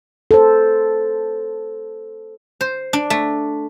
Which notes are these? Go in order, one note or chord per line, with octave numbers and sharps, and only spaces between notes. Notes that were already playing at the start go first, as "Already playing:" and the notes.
A4 C5
C5
D4
A3